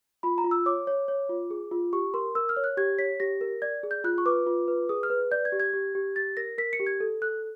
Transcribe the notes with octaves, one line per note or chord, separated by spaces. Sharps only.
F4 B5
A#5
F4
E6
C#5 D6
C#5
C#5
F4
G#4
F4
G4 C#6
A#4 C6
A#4 E6
F6
C#5
F#6
G4 G#6
C#5 B6
G4 A#6
A#4
D5 G#6
G#4
G6
F4 F#6
C#6
B4 D6
F4
B4
G#4 D#6
F6
B4
D5 G6
G#6
G4
G#6
G4
G4
G4 A6
A#4 A#6
A#4 B6
C#7
G4
G#6
A4
A4 F#6